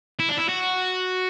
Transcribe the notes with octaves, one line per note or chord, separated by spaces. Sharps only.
E4
D4
E4
F#4